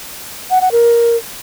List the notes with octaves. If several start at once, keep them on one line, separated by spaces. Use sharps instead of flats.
F#5
F#5
A#4